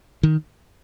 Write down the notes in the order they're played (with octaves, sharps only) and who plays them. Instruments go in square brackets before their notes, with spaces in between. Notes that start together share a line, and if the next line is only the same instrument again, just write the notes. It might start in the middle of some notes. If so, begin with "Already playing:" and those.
[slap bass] D#3